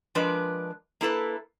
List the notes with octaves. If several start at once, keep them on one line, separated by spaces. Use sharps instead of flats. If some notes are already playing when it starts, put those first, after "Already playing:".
F3 G#3 D4 A#4 B4 D5
A#3 E4 A4 B4